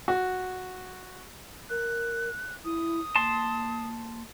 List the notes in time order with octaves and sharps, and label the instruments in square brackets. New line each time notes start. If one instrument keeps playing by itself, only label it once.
[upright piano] F#4
[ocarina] A#4 [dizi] F#6
[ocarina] E4 [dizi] D#6
[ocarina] A#3 [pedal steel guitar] A5 C6